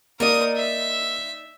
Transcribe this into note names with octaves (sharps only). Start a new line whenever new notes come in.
A#3 D#4 A#4 D5 D#5 D#6
E5